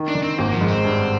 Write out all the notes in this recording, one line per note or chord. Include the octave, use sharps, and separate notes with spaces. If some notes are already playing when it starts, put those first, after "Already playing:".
Already playing: D#3
D4
D#3
C4
G#1 A#3
F3
G#2
C4
G2